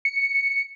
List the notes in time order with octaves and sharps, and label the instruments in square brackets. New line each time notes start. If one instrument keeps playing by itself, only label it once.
[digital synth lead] C#7